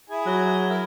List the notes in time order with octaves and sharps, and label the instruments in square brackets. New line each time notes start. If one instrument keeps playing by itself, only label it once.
[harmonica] E4 G#4 G#5
[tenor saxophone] F#3
[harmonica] E4 A#4